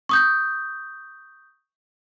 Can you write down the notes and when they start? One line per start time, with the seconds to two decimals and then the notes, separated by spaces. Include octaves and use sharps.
0.09 C#6 D#6 G6